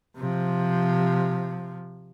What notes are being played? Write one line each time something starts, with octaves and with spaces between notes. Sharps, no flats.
C3 F3